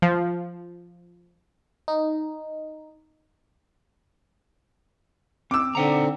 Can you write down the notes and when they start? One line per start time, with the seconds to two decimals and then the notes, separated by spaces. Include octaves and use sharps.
0.02 F3
1.88 D#4
5.51 C4 D6 E6
5.75 D3 C4 D#4 F#5 A#5